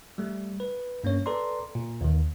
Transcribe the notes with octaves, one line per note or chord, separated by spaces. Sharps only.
G3 A3
B4
G2 A#3 C#4 C#5
A4 B4 D5 A#5 C6
A#2
D#2 D#3